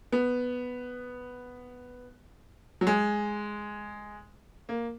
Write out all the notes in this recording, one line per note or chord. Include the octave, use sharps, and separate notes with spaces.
B3
F#3
G#3
A#3